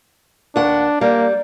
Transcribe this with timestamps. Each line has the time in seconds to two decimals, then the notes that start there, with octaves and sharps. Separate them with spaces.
0.56 D#2 D4 F#5
1.01 G3 A#3